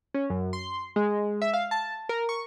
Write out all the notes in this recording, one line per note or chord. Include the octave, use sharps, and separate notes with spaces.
C#4
F#2
C6
G#3
E5
F5
A5
A#4
C#6